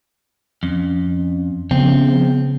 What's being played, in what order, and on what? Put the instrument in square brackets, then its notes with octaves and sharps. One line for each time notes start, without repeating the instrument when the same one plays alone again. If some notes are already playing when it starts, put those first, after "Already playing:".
[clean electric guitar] F2 [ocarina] C#4
[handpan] C#3 [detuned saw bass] F3 [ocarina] B3 [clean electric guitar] C4